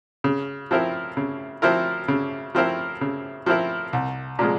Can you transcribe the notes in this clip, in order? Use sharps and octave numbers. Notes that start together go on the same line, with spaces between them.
C#3
F3 C4 E4 A#4
C#3
F3 C4 E4 A#4
C#3
F3 C4 E4 A#4
C#3
F3 C4 E4 A#4
C2
A#2 F3 G#3